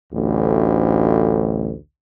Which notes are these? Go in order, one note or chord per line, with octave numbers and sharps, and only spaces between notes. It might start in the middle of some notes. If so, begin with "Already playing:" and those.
A1 D2